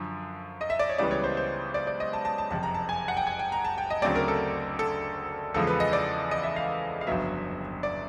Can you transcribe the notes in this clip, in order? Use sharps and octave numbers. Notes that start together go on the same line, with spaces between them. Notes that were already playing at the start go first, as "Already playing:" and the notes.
Already playing: F#2 D3 F3
D#5
E5
D5
C#5
C#2 C#3 E3 G3 B3 D5
C#5
C5
C5
D5
D5
D#5
A5
A5
A5
F#1 F2 C3 A5
A#5
A5
G#5
F#5
G5
G#5
G5
A#5
A5
G5
D#5
D2 C#3 F#3 A3 C4 D5
A#4
A4
A4
E2 C#3 F3 G#3 A4
B4
D#5
D5
D#5
E5
F5
F5
G1 F2 C#3 F#3 B3 E5
D5